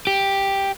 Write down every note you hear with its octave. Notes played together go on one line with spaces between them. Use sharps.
G4